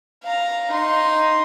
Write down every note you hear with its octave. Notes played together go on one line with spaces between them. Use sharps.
F5 A#5
D#4 C6